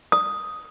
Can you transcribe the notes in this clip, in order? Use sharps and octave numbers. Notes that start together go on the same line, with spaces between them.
D#6